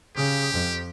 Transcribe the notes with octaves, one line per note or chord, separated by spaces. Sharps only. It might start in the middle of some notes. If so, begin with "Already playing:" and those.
C#3 G4
F2